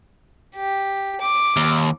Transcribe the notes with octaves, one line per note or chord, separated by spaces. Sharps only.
G4
D6
D#2